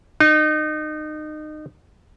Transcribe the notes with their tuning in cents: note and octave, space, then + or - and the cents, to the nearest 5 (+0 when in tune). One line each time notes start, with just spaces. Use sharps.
D#4 -25